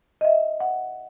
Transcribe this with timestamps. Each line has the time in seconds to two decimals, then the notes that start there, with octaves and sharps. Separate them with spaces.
0.21 D#5
0.24 E5
0.60 F#5